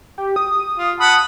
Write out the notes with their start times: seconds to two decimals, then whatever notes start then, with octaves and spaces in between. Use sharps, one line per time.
0.18 G4
0.36 D#6
0.78 F4
1.00 F#5 A5 B5 D#6